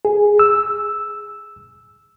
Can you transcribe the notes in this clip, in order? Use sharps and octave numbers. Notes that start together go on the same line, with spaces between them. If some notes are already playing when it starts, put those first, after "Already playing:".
G#4
E6